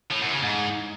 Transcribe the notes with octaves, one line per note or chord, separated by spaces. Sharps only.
A2
F#2
C#3
G#2